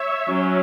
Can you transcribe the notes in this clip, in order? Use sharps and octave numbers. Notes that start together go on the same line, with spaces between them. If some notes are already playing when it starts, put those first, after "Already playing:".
Already playing: C#5 E5
F#3 C#4